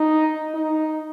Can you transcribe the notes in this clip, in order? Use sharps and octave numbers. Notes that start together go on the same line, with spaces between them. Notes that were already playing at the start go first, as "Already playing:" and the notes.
Already playing: D#4
D#4